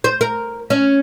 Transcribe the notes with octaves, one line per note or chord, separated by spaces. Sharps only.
C5
A#4
C#4